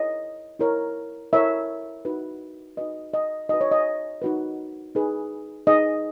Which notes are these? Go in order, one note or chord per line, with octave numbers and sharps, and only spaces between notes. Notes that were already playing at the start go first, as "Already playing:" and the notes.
Already playing: E4 A#4 C#5 D#5
E4 A#4 C#5
E4 A#4 C#5 E5
D#4 F#4 B4
D#4 F#4 B4 D#5
D#5
D#4 F#4 B4 D#5
C#5
D#5
D#4 F#4 B4
D#4 G#4 B4
D#4 G#4 B4 D#5